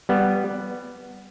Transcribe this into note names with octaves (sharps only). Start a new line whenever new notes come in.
G3 B3